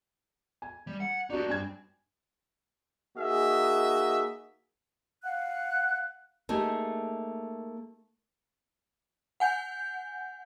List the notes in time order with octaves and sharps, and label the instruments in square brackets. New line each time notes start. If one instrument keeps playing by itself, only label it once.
[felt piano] G#5
[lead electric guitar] G3
F#5
[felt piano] D4 F#4 D5 [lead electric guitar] D#4 G4
[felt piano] G2 G#5 G#6 [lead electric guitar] C4
[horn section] A#3 D#4 F#4 G#4 D#5 E5
[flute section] F5 F#5 F#6
[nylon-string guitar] A3 A#3 D#4 G4 G#4
[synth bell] F#5 G#5 G6